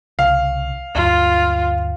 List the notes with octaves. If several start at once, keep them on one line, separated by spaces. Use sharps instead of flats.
C2 C#3 F5
D2 G2 F#3 F4